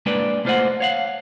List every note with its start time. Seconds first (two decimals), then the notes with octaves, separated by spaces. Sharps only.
0.06 G#3 A#3 D4 G4 B4 D5
0.45 A3 A#3 F4 C5 D#5 F#5
0.80 C#5 F5 F#5